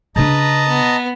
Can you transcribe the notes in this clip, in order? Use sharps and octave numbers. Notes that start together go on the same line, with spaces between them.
C#3 D4 B4 D#5 A5 A#5
B3